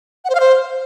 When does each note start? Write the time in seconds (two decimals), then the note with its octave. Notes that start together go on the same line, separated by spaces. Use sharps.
0.25 F#5
0.30 C5
0.35 F5
0.40 C5